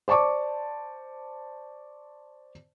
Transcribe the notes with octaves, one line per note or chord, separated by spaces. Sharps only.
C5 D5 A5 C#6 D6